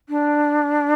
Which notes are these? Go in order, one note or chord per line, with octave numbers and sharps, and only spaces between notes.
D4